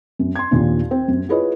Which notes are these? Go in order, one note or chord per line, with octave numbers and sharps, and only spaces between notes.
F#2
C6 G#6
D#2 A#2 D4
C4
F#2
E4 F4 G#4 B4 C#5 D#5